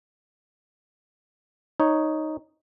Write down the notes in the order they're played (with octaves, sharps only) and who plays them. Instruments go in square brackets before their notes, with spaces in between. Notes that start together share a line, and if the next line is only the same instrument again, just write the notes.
[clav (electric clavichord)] D#4 C#5